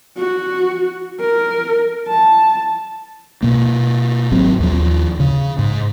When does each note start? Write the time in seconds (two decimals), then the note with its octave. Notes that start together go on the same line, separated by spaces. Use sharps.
0.17 F#4
1.20 A#4
2.08 A5
3.43 B2 A#3
4.32 G#1 F#3 C4
4.60 D#2 F3
5.20 C#3
5.59 G#2